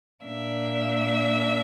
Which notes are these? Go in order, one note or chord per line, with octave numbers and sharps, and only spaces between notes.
A#2 A#3 D4 E5